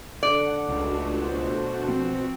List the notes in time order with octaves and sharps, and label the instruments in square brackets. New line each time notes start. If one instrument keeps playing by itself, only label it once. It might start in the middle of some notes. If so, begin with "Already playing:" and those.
[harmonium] D3 [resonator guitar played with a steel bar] D5 [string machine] F#5
[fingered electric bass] C#2 [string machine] A3 D4 F#4
[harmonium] B2 C5
[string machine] F3 F#4 [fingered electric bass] C4